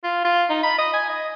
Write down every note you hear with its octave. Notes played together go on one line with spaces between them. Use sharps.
F4
F4
D#4
B5
D#5
G#5
D#5